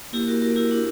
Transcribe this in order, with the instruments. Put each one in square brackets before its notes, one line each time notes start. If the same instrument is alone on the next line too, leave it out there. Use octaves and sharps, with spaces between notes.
[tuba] A#3 [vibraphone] E4 G4
[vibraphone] F#4 A#4
F#4 A#4
E4 G4
D4 F#4